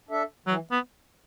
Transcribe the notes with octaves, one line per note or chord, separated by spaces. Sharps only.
D4 A4 E5
E3 F#3
B3